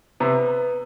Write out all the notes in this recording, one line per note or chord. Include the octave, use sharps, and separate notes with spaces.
C3 B3